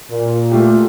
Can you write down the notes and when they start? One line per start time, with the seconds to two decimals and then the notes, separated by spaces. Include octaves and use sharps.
0.11 A#2
0.51 A3 F4 G4